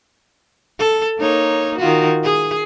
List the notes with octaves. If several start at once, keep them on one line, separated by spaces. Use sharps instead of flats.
A4
A#3 D#4 C#5
D#3 F4 F#4
G#4